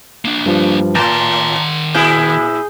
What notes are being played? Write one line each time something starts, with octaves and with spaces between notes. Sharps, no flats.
A#3 D4
G2 F3
A2 D#3 A5 A#5 C6
A#2 E4 G#4 G6